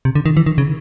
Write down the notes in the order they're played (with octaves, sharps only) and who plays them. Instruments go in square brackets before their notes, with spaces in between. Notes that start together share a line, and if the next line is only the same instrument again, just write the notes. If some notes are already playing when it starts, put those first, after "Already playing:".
[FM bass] C3
D3
D#3
E3
D#3
C#3